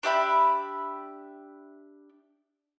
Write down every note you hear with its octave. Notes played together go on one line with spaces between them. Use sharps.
D4 G4 E5 B5